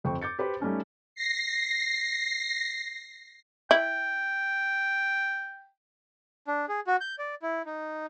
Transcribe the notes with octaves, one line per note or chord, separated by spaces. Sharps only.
G1 F2 C5 G5 C#6
D6 G6 A6 C#7
G4 B4 C5
G3 A3 C#4 D#4
A#6 C7
E4 G5
D4
G#4
F#4
G6
D5
E4
D#4